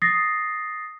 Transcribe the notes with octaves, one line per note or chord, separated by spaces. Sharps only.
D#6 A6 A#6 C7